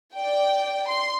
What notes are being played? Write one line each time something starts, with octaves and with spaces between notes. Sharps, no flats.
D5 G5
C6